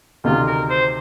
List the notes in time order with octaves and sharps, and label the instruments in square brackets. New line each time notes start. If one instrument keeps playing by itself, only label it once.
[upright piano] D2 C3 D#3 [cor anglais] F4
[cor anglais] A#4
C5